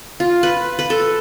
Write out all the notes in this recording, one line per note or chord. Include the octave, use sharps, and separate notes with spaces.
F4
B4
B4
A4